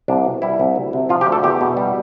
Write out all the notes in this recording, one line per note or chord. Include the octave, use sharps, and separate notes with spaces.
C2 D4
B2
G3 E4
C2
D2
C3
F3 F4
G4
D2
A4
E2 G4
B2
G3